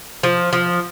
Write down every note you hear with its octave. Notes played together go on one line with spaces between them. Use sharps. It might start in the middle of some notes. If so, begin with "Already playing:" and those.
F3
F3